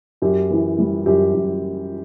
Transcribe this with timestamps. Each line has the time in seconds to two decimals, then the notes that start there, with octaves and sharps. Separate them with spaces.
0.22 F#2 G4
0.50 E3
0.78 G3
1.06 F#2 G4
1.34 F#2